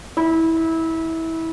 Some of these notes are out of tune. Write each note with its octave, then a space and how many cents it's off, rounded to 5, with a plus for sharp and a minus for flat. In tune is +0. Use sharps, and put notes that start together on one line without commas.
E4 -20